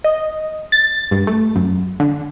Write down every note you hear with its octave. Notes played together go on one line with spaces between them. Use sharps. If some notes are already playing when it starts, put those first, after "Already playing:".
D#5
A6
G2
A3
F#2
D3